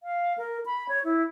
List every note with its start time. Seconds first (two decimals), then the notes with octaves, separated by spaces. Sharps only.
0.03 F5
0.38 A#4
0.66 B5
0.89 C#5
1.05 E4